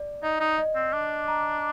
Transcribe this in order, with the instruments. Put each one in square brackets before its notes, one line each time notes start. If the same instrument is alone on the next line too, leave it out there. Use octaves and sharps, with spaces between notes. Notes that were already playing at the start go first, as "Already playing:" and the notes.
Already playing: [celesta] D5
[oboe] D#4 [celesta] D#5
[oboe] D#4
[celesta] D#5
[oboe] C4
[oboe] D4 [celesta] D6
[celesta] A#5